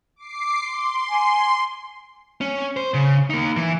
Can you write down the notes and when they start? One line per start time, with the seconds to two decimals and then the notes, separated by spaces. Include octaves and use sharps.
0.16 D6 C7
0.59 C6
1.09 G#5
2.41 C#4
2.77 C5
2.94 C#3
3.30 A#3 D#4
3.57 E3